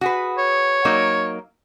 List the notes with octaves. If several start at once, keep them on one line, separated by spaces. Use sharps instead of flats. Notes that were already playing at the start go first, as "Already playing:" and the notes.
F#4 G#4 B4
C#5
F#3 A#3 D#4